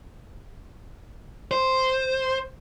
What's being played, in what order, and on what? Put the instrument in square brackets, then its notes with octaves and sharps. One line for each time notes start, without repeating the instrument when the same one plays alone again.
[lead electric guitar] C5